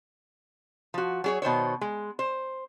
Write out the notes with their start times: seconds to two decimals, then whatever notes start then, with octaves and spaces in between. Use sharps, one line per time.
0.94 F3 F#4
1.24 F#3 G#4 C#5
1.42 B2 D#3 C5 C#5
1.81 G#3
2.19 C5